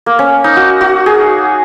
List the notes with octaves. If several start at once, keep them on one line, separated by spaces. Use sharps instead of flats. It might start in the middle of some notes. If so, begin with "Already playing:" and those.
A#3
C#4
D#4
F#4
F#4
G#4